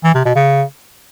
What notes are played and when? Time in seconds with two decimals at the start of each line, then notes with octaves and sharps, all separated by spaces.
0.04 E3
0.15 C3
0.25 B2
0.36 C#3